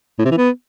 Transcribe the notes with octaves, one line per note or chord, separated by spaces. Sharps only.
A2
C3
E3
B3